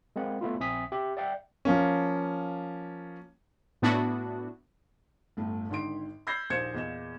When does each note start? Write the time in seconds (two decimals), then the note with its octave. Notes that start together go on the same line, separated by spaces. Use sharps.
0.16 G#3 A#3 C4 F#5
0.41 A3 B3 E4 F4
0.60 A#1 C4 E5 G#5 D#6 B6
0.92 G4 E5
1.17 D5 E5 F#5 G5
1.65 F3 A#3 C#4
3.82 A2 B3 D4 E4 F#4
5.37 G1 A2 A3
5.70 G#1 D3 D#3 C6 D7
6.27 B5 E6 G6 G#6 A#6 C7
6.50 A#1 D#2 C5 G#6 C#7 E7
6.74 E2 A#2 D#5 E7